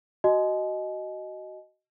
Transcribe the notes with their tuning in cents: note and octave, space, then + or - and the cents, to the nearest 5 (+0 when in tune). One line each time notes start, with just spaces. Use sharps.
F#4 +15 D#5 +0 G#5 +40